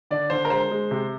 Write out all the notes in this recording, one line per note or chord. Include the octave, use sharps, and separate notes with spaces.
D3 D5
D3 C5
A#4
G#3 C5
G#3
C3